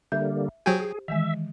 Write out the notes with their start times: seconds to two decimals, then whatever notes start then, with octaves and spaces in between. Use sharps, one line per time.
0.12 D3 G3 A#3 E5 G6
0.66 F#3 G4 G#4 C5 G5 G#5
0.79 G#4
1.08 D#3 E3 G#3 E5